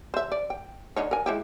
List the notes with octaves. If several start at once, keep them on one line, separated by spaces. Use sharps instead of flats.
C5 E5
D5
G5
D3 D#4 C#5
A#4 G#5
G#3 E4 G4